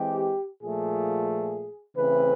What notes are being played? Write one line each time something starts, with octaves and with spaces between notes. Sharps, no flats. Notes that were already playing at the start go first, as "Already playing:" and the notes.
Already playing: E3 G#3 C4 G4
A#2 F3 A3 G#4
C#3 E3 A3 C4 B4